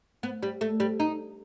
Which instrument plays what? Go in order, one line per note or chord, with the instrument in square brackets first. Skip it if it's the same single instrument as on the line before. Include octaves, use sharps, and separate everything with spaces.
[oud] B3
G3
A3
G3
D#4